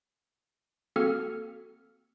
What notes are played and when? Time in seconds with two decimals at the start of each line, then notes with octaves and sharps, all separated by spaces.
0.96 A#3 C4 F#4 A4 F6 C#7